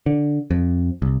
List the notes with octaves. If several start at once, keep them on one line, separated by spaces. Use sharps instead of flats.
D3
F2
C2